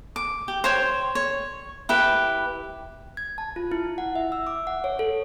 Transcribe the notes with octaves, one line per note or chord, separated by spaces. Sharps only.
D6
G4
C5 C#5 G5
C#5
E4 G4 B4
G#6
A5
F4
E4
F#5
E5
E6
D6
F#5
C#5
A4